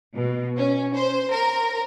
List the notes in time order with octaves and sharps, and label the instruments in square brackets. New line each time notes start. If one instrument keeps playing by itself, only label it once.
[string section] B2
C#4
C5
A#4